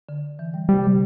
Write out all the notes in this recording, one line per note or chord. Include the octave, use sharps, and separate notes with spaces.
D3
E3
G3
C3 G3
D3